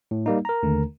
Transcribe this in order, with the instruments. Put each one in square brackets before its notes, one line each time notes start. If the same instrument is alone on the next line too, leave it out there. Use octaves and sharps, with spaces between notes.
[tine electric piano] A2
G3 A#3 D#4
A#4 A#5
[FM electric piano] D#2 D3 A3